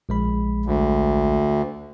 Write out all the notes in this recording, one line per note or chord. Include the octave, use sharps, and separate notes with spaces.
A#1 G#3 B5
D2